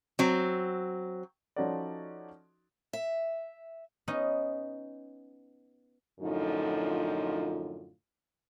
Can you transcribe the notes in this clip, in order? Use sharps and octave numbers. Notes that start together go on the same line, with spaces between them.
F#3 C4
F3 C#4 D#4 F#4 A4 D5
E5
B3 C#4 D#4 D#5
F#2 A2 D3 F3 D#4 F4